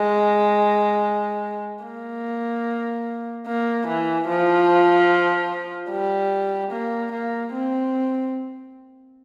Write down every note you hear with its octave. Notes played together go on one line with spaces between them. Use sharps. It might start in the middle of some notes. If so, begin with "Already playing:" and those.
Already playing: G#3
A#3
A#3
E3
F3
G3
A#3
A#3
C4